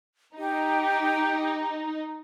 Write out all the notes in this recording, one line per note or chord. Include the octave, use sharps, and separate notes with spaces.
D#4 G4